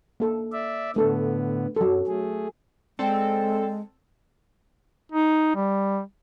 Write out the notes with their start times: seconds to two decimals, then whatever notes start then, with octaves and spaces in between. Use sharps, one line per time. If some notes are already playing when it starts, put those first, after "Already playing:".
0.20 A#3 A4
0.52 D5 E5
0.96 A2 D3 A3 B3 A4
1.76 F#2 F#3 A4
2.07 A3 G#4
2.99 G#3 C4 A4 D5 G5
5.12 D#4
5.56 G3